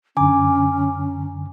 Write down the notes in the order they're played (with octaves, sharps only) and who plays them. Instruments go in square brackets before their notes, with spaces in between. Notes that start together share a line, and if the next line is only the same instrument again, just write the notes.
[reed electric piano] F#2 D3 [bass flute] C#4 [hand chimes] G#5 A#5 D6